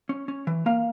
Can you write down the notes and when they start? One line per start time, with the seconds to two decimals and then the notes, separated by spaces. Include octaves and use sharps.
0.09 C#4
0.28 C#4
0.47 E3
0.66 A#3 F5